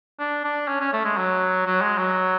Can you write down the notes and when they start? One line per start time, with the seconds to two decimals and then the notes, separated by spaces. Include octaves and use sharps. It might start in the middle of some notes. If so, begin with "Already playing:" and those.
0.19 D4
0.44 D4
0.68 C#4
0.80 C#4
0.93 A3
1.05 G#3
1.17 F#3
1.66 F#3
1.81 G#3
1.98 F#3